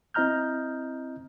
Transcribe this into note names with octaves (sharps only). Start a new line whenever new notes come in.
C4 E4 D#5 A#5 F6 G6